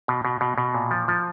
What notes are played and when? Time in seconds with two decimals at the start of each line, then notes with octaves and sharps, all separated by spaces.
0.08 B2
0.25 B2
0.41 B2
0.58 B2
0.75 A#2
0.91 F3
1.08 F3